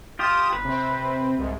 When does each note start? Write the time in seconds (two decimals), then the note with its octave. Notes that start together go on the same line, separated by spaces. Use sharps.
0.19 F4 G4 D#6 E7
0.53 G1 B4
0.64 C3 C4
1.38 C2 G#2